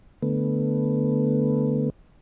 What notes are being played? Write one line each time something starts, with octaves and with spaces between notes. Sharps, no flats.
D3 A3 B3